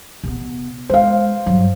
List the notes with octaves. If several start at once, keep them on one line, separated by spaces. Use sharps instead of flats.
C3 B3
G#3 C5 F5
G2 F#3